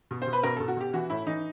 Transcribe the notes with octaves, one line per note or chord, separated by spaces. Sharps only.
B2
C5
B2
B4
B2 A#4
B2 A4
F#4
B2 G4
E3 F#4
A2 E4
E3 D#4